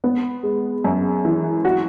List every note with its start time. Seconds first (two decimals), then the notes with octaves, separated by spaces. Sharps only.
0.04 B3
0.43 G#3
0.84 F#2
1.25 E3
1.65 F#4